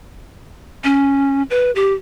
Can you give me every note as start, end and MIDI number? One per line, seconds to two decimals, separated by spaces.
0.84 1.43 61
1.50 1.71 71
1.75 1.93 67